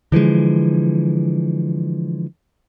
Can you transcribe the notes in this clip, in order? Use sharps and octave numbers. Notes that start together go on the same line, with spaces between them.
D3 E3 F3 G#3